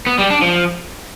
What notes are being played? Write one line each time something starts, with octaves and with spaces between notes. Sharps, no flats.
B3
G3
D4
F3